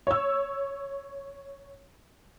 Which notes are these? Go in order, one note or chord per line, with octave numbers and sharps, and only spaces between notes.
C#5 E6